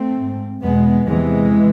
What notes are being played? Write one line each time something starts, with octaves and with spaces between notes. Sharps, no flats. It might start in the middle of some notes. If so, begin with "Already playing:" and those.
Already playing: A3 C4
G#2
E2 B2 G#3 B3
E2 C3 E3 G#3